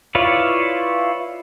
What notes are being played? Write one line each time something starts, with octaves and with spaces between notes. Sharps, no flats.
E4 F4 B4 C#5 D5